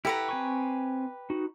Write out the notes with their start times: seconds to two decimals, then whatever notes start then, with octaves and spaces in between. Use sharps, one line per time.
0.05 E4 G4 A4 B4 F#5 A#5
0.29 C4 G#5 C#6
1.30 D#4 F#4